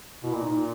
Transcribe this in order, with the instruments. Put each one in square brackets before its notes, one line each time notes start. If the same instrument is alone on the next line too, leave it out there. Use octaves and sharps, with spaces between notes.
[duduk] B2 [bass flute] E4
[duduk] A#2
[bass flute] D#4
[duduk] A#2